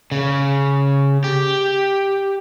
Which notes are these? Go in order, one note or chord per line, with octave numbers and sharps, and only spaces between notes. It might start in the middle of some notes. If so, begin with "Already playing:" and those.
C#3
G4